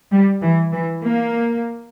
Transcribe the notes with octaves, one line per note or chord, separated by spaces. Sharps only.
G3
E3
E3
A#3